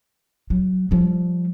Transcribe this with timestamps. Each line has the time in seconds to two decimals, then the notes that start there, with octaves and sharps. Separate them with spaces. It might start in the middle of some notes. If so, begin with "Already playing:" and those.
0.50 F#3
0.91 F3 G3